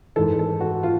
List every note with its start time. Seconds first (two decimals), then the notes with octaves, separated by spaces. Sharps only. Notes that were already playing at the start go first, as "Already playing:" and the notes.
0.16 G#2 E3 A4
0.39 A4
0.61 F#4
0.83 F4